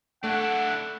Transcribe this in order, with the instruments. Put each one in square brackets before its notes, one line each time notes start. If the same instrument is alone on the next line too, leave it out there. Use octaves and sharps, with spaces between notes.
[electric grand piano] A3 [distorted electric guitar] D4 E4 [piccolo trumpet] F#5